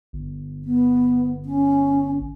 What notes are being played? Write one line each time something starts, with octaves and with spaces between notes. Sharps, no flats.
G1
B3
C#4